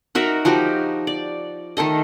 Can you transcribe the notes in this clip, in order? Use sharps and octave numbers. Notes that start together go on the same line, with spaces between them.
D#4 F#4 A#4 E5
F3 D#4 F#4 G4
D5
D#3 A3 A4 D#5